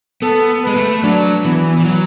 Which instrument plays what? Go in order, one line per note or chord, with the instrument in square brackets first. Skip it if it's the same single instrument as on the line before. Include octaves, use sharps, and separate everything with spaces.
[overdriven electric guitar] B3 [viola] A4
[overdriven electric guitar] G#3 [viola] B4
[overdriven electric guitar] A3
A3
[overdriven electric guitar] F#3 [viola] D4
[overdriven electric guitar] E3 [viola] B3
[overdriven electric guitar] E3
F#3